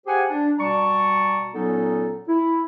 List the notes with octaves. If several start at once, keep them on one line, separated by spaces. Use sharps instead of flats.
G4 G#4 C5 F#5 G#5
D4
B2 G3 D5 A5 A#5 C#6
A#2 F#3 B3 C#4 D#4 A4
E4